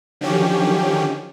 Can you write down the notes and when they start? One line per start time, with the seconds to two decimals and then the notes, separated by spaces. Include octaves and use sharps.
0.21 D3 D#3 F3 F#3 C#4 G4